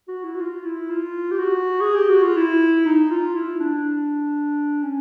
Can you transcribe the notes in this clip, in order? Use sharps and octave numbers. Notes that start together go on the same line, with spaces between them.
F#4
E4
F#4
F4
E4
F4
G4
F#4
G#4
G4
F#4
F4
E4
D#4
F4
E4
D4
C#4